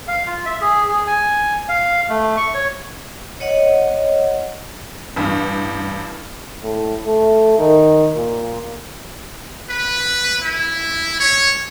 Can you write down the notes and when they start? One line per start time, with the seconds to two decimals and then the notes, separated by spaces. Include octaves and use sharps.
0.08 F5
0.27 F4
0.45 E5
0.61 G#4
0.89 G#4
1.07 G#5
1.69 F5
2.09 A3
2.37 C#6
2.55 C#5
3.40 C#5 D#5 F#5
5.16 A1 G2
6.63 A2
7.06 A3
7.59 D#3
8.16 A#2
9.70 B4
10.42 E4
11.20 C#5